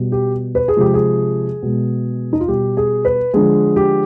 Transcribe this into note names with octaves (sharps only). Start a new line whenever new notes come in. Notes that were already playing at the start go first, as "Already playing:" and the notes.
Already playing: B2 G3
G4
B4
G#4
C3 F3 G#3 G4
G#4
B2 G#3
D#4
F4
B2 G3 G4
G#4
B4
D3 F3 G#3 G#4
G4